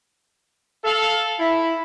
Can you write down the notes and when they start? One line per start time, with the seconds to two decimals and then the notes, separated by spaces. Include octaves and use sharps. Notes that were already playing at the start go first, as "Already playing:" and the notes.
0.84 A4 F5
1.39 E4